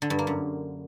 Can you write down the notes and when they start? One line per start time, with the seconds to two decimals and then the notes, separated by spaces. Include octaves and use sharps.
0.02 D3
0.10 G2
0.19 A#3
0.27 F#2